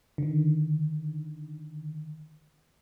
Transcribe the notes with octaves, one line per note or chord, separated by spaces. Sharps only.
D3 D#3